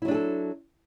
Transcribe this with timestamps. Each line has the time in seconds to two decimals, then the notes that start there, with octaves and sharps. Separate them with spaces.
0.02 E4
0.05 F#3
0.08 D4
0.11 G#4
0.14 A4